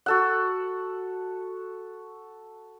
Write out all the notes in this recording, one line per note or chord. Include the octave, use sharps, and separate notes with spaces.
F#4 A4 F#5